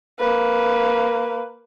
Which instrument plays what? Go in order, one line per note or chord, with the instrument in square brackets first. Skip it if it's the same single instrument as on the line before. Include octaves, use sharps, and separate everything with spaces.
[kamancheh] A#3 B4